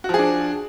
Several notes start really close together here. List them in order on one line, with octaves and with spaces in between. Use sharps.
F#4 F3 G#4 D4